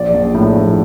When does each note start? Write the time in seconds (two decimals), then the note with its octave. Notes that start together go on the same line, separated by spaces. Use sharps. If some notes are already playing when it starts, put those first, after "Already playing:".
Already playing: A#1 D5
0.14 A#1
0.34 A2
0.56 A#1